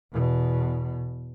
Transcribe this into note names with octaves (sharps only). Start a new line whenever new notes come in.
E2 B2